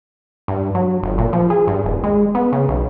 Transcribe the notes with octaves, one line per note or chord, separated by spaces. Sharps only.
G2
F#3
G1
A#2
F3
G#4
G2
D#1
G#3
B3
C#3
B1